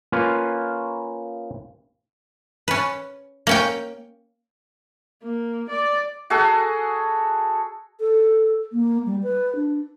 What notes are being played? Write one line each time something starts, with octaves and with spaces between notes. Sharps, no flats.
A#3 C#4 F4 B4 F5
C#4 B4
A#3 C#4 G5
A#3
D5
F#4 G#4 A4 F#5
A4
A#3
G3
B4
D4